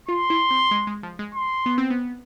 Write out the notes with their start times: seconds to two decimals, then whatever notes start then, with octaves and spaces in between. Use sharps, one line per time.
0.09 F4 C6
0.30 E4
0.51 C4
0.71 G#3
0.87 G#3
1.03 F3
1.19 G#3
1.35 C6
1.66 B3
1.78 C4
1.90 B3